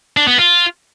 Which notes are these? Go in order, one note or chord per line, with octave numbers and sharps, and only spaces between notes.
D4
B3
F4